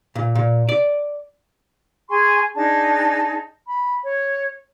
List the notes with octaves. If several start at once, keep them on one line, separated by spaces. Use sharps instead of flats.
A#2
A#2
D5
G#4 G#5 C6 C#6
D4 D#4 G#4 A5
B5
C#5